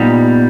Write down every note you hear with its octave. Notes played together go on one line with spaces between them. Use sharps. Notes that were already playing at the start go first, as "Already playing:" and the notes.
Already playing: A#2 G3 B3 D#4